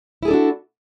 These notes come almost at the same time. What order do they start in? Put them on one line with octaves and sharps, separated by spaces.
E4 G#4 A4 D4 F#4